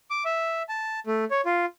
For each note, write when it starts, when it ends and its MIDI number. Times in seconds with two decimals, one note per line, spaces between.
0.11 0.24 86
0.25 0.63 76
0.69 1.00 81
1.07 1.25 57
1.31 1.41 73
1.45 1.65 65